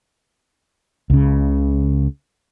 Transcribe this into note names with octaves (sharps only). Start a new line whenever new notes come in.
C#2 C#3